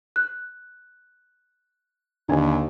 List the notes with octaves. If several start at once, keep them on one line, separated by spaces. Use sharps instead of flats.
F#6
D#2 D3 G#5